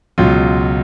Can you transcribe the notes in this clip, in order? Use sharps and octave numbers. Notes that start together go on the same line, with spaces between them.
C#2 B2 F#3 F4